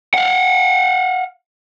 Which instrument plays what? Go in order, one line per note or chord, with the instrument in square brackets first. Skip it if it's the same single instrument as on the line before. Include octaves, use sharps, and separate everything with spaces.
[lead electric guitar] F5 F#5